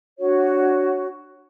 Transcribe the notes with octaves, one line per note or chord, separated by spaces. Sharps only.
D4 F#4 C#5